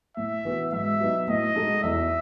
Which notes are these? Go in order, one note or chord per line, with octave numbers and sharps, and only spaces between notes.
A2 E5
E3 B3 F#4
G#2 E5
F#3 B3 D#4
A2 D#5
G#3 D#4 F#4 A4
E2 E5